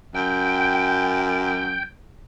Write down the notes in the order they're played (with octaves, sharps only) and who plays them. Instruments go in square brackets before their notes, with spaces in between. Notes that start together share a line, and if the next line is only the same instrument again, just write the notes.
[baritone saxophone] F#2 [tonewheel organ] G5